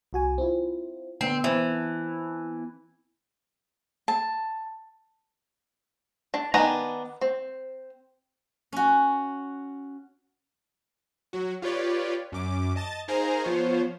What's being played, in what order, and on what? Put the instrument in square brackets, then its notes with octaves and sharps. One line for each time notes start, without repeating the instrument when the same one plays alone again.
[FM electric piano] C2 F#4 G#5
C4 E4 F4
[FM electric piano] D3 B3 D4 [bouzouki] C4
[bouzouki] E3 [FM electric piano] B3 C4 A5
[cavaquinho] A5
[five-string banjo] D4
D#3 B3 D4 G#5 A#5
C4
[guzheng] C#4 F#4
[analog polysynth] F#3 F#4
F4 G4 B4 C#5 D5
F#2 D6
D#5 A5 A6
D#4 G#4 A#4 C5 F5 A#5
F3 B3 F4 C5 C#5